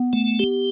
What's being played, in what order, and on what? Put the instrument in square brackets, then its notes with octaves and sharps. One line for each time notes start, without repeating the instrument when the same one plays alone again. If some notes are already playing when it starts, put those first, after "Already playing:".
Already playing: [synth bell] B3
[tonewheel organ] A3
G4